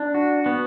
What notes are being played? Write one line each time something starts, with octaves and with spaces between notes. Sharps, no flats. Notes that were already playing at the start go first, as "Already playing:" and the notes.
Already playing: D4
F#4
B3